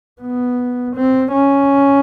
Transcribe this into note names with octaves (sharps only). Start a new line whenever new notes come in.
B3
C4
C#4